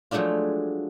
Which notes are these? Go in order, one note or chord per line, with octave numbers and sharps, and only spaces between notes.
F3 F#3 G#3 A3 D4 F4